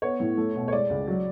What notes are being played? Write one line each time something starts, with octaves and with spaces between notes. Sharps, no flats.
B3 C#5
A2
A3
B2
C#5
G#3 D5
C#2
F#3